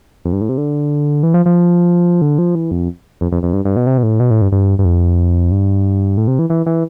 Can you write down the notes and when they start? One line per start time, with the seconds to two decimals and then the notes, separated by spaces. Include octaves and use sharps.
0.25 F2
0.33 G2
0.41 A2
0.49 C3
0.58 D3
1.23 E3
1.34 F3
1.46 F3
2.22 D3
2.38 F3
2.55 E3
2.71 F2
3.21 F2
3.32 F2
3.43 F2
3.53 G2
3.65 G2
3.76 B2
3.87 C3
3.98 B2
4.03 A2
4.20 B2
4.31 A2
4.42 G2
4.52 G2
4.79 G2
4.85 F2
5.52 G2
6.17 A2
6.28 C3
6.39 E3
6.50 E3
6.66 E3